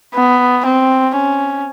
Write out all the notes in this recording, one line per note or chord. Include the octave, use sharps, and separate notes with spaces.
B3
C4
C#4